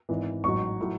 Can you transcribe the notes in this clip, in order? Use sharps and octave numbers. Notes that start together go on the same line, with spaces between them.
G#1 G#2 E3
A1 G#2 F#3 C#6
A2 F#3